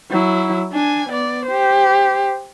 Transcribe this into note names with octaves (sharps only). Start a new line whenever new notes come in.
F#3 E4
D4 G#5
B3 D5
G4 C5